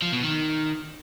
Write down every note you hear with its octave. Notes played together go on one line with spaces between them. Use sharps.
F3
B2
D#3